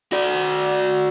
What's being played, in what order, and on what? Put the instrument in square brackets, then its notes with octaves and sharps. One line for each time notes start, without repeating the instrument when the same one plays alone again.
[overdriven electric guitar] F#4 D5